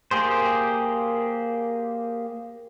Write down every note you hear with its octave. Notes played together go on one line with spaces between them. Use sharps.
A#3 G4 G#4 C5